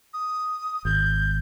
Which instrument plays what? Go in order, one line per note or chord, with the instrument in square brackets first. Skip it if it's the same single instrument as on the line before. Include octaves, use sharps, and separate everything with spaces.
[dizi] D#6
[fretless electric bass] G#1 [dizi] G6